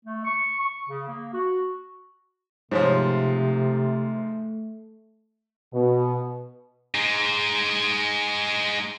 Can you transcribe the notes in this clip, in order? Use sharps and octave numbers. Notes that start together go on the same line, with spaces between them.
A3
C#6
C#6
C#3
A#3
F#4
G#2 C3 F3 A3 C5 C#5
B2
G#3 D#4